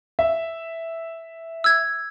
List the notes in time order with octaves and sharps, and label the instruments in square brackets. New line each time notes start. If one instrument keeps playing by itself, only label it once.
[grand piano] E5
[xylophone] E6 G#6